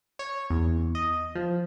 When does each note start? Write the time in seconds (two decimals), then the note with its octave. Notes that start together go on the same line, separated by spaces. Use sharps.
0.19 C#5
0.50 E2
0.95 D#5
1.35 F3